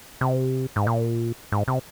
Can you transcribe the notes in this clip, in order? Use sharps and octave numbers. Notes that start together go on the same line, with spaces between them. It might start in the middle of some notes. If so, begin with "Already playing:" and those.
C3
G#2
A#2
G#2
C3